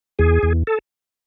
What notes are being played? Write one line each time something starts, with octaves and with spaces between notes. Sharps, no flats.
E2 G#4
E2
A4